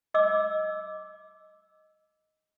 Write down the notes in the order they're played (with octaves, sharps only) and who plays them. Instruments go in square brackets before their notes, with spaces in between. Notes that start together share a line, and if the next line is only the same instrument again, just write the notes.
[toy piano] D#5 D6 E6